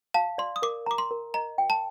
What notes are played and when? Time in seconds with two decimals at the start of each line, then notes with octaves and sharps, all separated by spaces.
0.14 F5 A5
0.38 D5 C6
0.56 D#6
0.62 A#4 D6
0.86 A#5 D6
0.98 C6
1.11 A#4
1.34 D#5 A#5
1.58 G5
1.70 A5